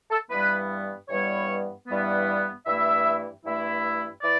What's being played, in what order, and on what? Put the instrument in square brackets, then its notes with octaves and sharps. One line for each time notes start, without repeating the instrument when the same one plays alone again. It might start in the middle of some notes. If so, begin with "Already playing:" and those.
[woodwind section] A4
G2 E3 G3 B3 B4
G2 E3 G3 B3 C#5
G2 E3 G3 B3
G2 E3 A3 E4 E5
G2 E3 A3 E4
E3 D5